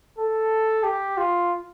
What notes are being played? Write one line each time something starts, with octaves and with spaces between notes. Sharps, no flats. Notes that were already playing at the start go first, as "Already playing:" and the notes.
A4
G4
F4